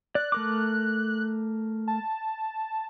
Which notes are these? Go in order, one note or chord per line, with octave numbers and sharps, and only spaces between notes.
D5 F#6
A3 A#4 D6
A5